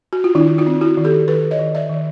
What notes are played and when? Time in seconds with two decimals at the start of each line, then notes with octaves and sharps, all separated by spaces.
0.13 F#4
0.24 F4
0.35 D#3 D4 E4
0.58 D#4 F4
0.66 C4
0.81 E4 F#4
0.98 D#3
1.04 G4 A4
1.28 D#3 A4 B4
1.51 C#5 D#5
1.59 D#3
1.75 D5 E5
1.90 D#3